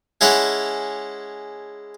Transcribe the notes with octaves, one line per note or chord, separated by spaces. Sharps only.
G#3 C#4 E4 A4 C#5 F#5